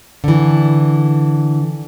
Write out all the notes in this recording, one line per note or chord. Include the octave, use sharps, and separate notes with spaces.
D3 E3